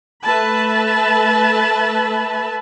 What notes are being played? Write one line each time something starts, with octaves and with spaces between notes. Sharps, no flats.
A3 B4 E5 A5 B5